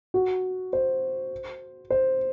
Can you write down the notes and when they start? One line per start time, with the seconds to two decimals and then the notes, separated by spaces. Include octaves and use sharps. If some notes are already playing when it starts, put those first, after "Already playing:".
0.14 F#4
0.73 C5
1.90 C5